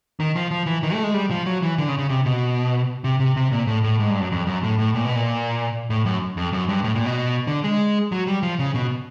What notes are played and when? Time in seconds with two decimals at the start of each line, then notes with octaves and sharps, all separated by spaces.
0.20 D#3
0.36 F3
0.51 F3
0.66 E3
0.83 D#3
0.93 A3
1.04 G#3
1.14 G3
1.31 F3
1.46 F#3
1.62 E3
1.78 D3
1.89 C#3
1.99 C#3
2.09 C3
2.26 B2
3.04 C3
3.20 C3
3.36 C3
3.51 A#2
3.67 A2
3.84 A2
3.99 G#2
4.10 G2
4.20 F#2
4.32 F2
4.47 F#2
4.63 A2
4.79 A2
4.95 A#2
5.05 B2
5.16 A#2
5.90 A2
6.06 F#2
6.37 F2
6.53 F#2
6.69 G2
6.84 A2
6.95 A#2
7.06 B2
7.47 D3
7.64 G#3
8.12 F#3
8.27 G3
8.43 F3
8.59 C#3
8.75 B2